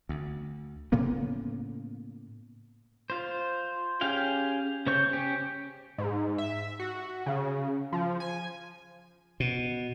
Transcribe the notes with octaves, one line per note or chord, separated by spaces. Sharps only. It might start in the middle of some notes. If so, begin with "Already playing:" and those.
D2
A2 C#3 A#3 B3
F4 C5
C#4 G4 G#4 F5 G5
C#3 C5 C#5 C#6 G6
C#4 G4
G#2
E5
F#4
C#3
F3
G#5
B2